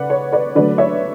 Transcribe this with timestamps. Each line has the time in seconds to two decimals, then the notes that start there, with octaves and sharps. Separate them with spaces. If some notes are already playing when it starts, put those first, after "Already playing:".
Already playing: C#3 B4 D5 F#5
0.10 C#5
0.32 B4 D5
0.55 D3 F#3 A3 B4 D5
0.78 C#5 E5